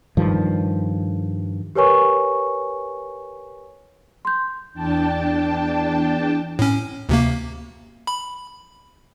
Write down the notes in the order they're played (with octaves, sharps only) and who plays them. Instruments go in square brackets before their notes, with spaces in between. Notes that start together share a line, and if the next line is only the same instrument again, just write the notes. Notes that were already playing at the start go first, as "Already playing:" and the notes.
[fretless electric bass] G2 D#3 F3
[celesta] G4 A#4 B4 C#5 G#5 C#6
C6 G6
[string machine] E2 D4 G5 A5
[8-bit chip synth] A2 C#4
D2 C3 A#3
B5